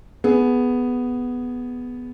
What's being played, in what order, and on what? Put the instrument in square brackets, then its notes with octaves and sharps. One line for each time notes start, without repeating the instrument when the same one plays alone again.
[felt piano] B3 G#4